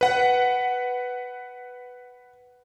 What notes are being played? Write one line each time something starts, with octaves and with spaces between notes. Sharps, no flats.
B4 F#5